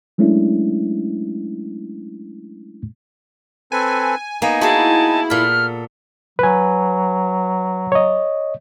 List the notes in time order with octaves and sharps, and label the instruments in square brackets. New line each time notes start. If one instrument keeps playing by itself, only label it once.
[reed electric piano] F#3 G#3 A3 C#4 D4 E4
[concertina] C4 A4 B4 [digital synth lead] G#5
[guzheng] A#3 B3 [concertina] D#4 G#5
[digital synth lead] E4 [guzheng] F#4 G#4 [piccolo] A5
[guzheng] A#2 B5 [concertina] A4 [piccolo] F6
[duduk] F#3 [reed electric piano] B4 G#5
[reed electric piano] C#5 D#5